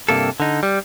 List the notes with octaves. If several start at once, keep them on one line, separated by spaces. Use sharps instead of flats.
G2 C3 A#3 A4
D3 D#4
G3